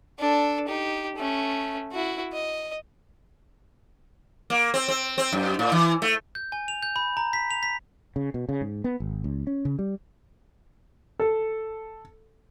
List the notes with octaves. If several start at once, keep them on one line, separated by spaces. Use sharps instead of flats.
D4 A4
D#4 G4
A3 C#4
E4 F#4
D#5
A#3
C4
C4
C4
F#2
A2
E3
A3
G6
G#5
F7
G6
B5
A#5
B6
F7
B6
C#3
B2
C#3
G#2
B3
G#1
C#2
C#4
C#3
G3
A4